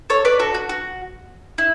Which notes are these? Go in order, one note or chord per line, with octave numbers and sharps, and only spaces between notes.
A4 C#5
B4 D5
F#4 A4
F#4
F#4
E4